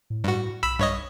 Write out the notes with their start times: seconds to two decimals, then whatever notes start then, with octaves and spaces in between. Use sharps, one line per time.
0.10 A2
0.24 G2 F#4
0.63 B1 B5 E6
0.79 G2 C#5 D#5